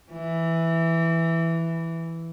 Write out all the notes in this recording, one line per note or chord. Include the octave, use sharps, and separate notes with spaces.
E3